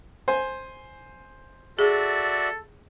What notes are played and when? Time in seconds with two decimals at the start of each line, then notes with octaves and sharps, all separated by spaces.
0.28 C5 G#5
1.79 F#4 G#4 A4 D5 E5